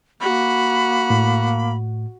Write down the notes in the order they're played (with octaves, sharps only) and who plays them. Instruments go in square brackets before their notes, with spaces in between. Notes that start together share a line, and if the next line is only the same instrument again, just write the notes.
[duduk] A#3 [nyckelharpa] F#4 [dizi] B5
[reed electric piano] A2